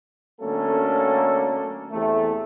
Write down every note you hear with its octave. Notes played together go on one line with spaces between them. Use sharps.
D3 F#3 A3 A#3 C#4 A4
E2 C3 E3 A3